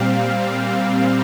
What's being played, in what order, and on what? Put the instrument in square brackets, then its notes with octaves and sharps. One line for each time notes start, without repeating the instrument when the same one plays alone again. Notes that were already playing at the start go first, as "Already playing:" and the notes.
Already playing: [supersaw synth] A#2 G3 C4 F5